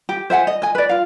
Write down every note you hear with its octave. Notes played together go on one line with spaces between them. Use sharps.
G4
C5 E5 F#5 G#5
D#5
D#5 G#5
B4 D5
F4 F5